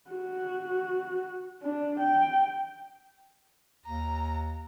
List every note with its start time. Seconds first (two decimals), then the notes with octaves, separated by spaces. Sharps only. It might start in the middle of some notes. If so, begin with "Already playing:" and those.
0.10 F#4
1.62 D4
2.00 G5
3.86 D#2 A#5